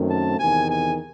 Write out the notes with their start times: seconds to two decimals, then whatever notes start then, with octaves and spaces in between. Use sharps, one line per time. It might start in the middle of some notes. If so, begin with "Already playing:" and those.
Already playing: F#2 D#3 A3 C4
0.09 A5
0.39 E2 C3 D#3 G#5
0.69 G#5